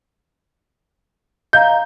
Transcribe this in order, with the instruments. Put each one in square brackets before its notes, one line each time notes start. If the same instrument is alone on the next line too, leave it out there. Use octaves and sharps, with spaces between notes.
[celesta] D#5 F5 A#5 [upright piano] G6